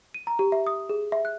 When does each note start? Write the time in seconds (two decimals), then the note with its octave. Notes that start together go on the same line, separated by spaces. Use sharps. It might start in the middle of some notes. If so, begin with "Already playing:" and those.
0.14 D#7
0.27 A#5
0.39 G4
0.52 E5
0.67 D#6
0.89 G#4
1.12 E5
1.25 F#6